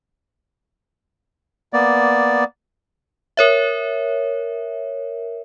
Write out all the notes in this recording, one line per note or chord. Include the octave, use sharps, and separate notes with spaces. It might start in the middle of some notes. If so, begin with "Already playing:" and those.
A#3 B3 D5
A#4 C#5 E5